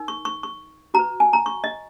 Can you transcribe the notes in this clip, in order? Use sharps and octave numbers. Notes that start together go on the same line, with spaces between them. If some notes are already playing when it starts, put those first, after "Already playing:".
Already playing: D#4 A#4
C#6
C#6
C#6
F#4 A#5
B4
G#5
A#5
C#6
D#5